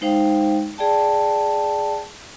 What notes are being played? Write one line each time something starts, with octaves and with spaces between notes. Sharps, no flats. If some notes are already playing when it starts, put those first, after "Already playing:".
G#3 D#4 C5 F5 G5
G#4 D5 G5 A5